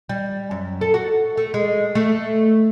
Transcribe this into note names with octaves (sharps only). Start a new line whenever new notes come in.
G3
F#2
A4
F#4
A3
G#3
A3